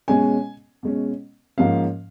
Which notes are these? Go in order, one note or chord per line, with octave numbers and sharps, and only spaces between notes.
B2 G#3 C#4 G#5
B2 G#3 C#4
G#2 F3 A#3 C#4 F5